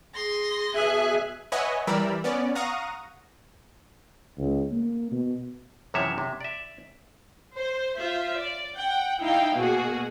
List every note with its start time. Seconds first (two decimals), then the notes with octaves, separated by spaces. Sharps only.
0.14 G#4 C6 A#6
0.75 B2 G#4 E5 G#5 F#6
1.52 B4 C#5 D#5 E5 F#5 G#5
1.87 E3 G3 A#4 D5 B5 E6
2.24 B3 C#4 D5
2.55 F5 F#5 A#5 C#6 D#6 A#6
4.38 C#2
4.72 A#3
5.12 B2
5.94 F#2 C3 E3 F3 C#5 E5
6.18 C3
6.41 D5 E5
7.56 C5
7.97 F4 C5 E5
8.35 D5
8.76 F#5 G5
9.21 D#4 E4 F5 G5
9.56 B2 A#3 F#4 G#4